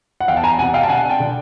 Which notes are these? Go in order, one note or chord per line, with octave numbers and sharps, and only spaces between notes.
F#5
E2 F5 G5
A5
G#5 A#5
C3 F#5 G#5
F5 G5
A5
D3 F#5 G#5
G5 A5
D3